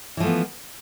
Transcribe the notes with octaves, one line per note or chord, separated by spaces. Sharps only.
E3 F3 A3 B3